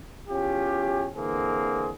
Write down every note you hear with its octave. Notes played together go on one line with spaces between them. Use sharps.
E2 C#4 F4 G4
D3 E3 A#3 C4 G#4